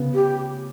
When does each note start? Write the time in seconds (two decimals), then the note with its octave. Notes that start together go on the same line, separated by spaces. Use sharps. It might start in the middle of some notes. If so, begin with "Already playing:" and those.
Already playing: C#3 B3
0.14 G4